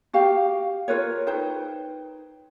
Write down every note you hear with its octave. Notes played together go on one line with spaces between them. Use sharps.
F#4 G4 F5 G5
F4 A#4 B4 C#5
D#4 B4 C5 G5